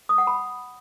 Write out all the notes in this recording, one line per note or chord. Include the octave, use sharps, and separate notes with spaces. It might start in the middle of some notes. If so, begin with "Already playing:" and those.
D#6
F#5
B5